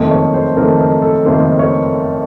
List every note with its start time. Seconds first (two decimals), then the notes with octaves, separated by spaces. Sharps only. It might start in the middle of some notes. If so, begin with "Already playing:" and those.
Already playing: F#1 F2 D#3 A3
0.11 C#5
0.34 C5
0.57 F#1 F2 D#3 A3 A#4
0.79 A#4
1.02 A4
1.24 F#1 F2 D#3 A3 C5
1.59 C#5